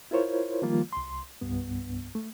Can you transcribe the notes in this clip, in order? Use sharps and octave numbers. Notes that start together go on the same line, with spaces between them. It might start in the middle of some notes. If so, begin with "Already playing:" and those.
E4 F4 A#4 C5 C#5
D#3 F3 G3 A#3 F4
C2 C6
C2 G2 B3
A3